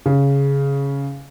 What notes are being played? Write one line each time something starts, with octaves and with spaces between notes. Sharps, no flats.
C#3